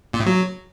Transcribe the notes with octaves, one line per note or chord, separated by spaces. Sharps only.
A#2
A2
F#3